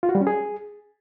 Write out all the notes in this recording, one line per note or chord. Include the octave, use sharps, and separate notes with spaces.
F4
F#4
G3
C#4
G#4